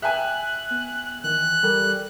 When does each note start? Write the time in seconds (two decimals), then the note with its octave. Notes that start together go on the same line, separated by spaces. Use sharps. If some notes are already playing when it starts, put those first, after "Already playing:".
0.02 E5 G5 G#5 F#6
0.71 B3
1.24 D#3 E3 F#6
1.63 G3 A4 A#4